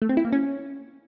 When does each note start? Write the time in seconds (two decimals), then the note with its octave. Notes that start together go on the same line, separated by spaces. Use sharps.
0.02 A3
0.09 C4
0.17 E4
0.25 A#3
0.32 C#4